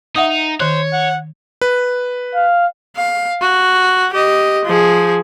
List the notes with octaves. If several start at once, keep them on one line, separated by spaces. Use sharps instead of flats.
D#4 E5 F#5 D#6
D#3 C5 C#5 F#6
F#5
B4
F5
F5
F#4
G4 D#5
F3 G#4